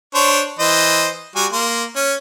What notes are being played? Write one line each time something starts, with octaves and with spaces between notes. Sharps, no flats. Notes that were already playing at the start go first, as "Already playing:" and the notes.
D4 C5 C#5
E3 C5 D#5
G3 F#4 G#5
A#3 C6
C#4